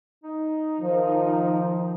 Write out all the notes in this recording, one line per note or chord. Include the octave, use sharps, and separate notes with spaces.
D#4
D#3 F3